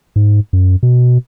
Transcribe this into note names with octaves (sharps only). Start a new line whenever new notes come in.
G#2
F#2
B2